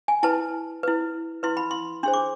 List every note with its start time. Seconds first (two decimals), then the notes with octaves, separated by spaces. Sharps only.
0.08 G#5
0.23 E4 B4 A5
0.83 E4 B4
1.43 E4 B4 C6
1.57 B5
1.71 C6
2.03 D4 G#4 C5 C6
2.13 D6